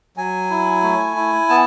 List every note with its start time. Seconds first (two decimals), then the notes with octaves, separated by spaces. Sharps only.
0.17 F#3 G#5
0.50 E4
0.83 A3
1.17 E4
1.49 B3 A5